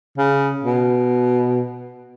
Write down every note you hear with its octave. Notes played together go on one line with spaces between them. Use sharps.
C#3
B2